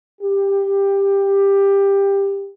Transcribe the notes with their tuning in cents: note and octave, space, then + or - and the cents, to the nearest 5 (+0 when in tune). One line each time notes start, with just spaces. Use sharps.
G4 +15